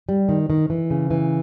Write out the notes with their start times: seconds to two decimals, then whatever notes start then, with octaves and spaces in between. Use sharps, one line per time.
0.09 G3
0.29 D#3
0.50 D#3
0.70 E3
0.90 C#3
1.11 E3